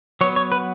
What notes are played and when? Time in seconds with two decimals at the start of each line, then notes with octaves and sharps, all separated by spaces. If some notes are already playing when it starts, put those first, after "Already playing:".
0.21 F#3 B3 C#5
0.36 C#5
0.52 B4